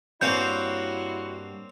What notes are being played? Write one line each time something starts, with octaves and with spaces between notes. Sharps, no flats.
G2 A#3 C4 E4 F#4 C#5 G#5 G6